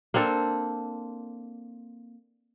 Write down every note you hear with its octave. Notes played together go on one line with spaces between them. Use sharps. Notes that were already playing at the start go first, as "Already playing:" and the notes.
A#3 C4 D4 A4